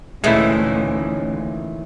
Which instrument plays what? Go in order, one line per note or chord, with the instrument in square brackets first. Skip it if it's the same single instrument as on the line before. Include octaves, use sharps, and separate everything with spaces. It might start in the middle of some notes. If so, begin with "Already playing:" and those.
[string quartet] D2 [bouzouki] A#2 D#3 E3 [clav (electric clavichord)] G#3 A3 E4 [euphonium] C#4